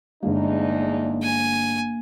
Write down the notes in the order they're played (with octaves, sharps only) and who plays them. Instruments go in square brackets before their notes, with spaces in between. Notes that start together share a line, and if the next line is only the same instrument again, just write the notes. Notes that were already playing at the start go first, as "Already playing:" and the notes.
[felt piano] G1 G#3 [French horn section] E2 D4 D#4 [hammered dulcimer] A#3
[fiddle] G#5